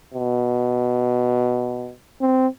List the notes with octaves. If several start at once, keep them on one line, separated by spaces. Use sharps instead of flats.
B2
C4